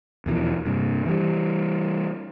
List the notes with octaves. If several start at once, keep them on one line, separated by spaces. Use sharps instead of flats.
E2 B2 E3 F3
G2 C3
E3 G3